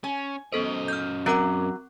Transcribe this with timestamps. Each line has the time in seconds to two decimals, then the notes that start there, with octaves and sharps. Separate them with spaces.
0.04 C#4 G#5
0.52 F#2 B3 A4 C5 D#5
0.88 F6 G6
1.26 F#3 C4 A#4 D6